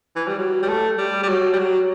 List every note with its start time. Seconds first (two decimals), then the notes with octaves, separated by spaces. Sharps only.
0.16 E3
0.27 G3
0.38 F#3
0.62 G3
0.68 A3
0.98 G3
1.23 G3
1.28 F#3
1.53 G3
1.58 F#3